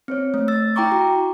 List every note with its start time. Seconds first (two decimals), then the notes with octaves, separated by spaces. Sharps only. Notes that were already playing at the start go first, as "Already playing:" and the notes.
0.08 C4 C5 C#5
0.34 A3
0.48 E6 A6
0.76 E4 G5 A#5 C#6 D6
0.92 F#4